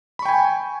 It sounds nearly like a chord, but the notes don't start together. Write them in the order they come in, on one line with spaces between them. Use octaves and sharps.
B5 C#6 G5 G#5